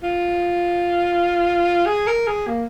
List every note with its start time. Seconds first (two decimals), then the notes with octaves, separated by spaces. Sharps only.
0.03 F4
1.86 G#4
2.07 A#4
2.27 G#4
2.47 A#3